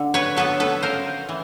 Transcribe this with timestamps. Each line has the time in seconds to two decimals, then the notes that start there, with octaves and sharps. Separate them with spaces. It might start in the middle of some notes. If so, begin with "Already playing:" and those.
Already playing: D3
0.14 B4 C#5
0.36 F#3 B3 A4 B4
0.60 A4 B4
0.82 C#3 A#4 C5
1.29 E3